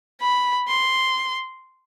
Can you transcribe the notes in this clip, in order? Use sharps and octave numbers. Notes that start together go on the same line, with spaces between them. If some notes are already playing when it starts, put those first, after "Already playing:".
B5
C6